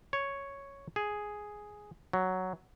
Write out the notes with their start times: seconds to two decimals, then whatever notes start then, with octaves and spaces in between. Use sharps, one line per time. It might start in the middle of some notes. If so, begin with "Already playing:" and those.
0.13 C#5
0.96 G#4
2.13 F#3